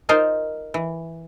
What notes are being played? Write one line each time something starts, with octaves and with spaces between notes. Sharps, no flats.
D#4 F4 A#4 C5 D#5 F5
E3